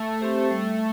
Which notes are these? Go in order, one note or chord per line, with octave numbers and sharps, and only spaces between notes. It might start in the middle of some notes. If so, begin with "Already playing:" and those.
Already playing: A3
C4 G4 C5
G3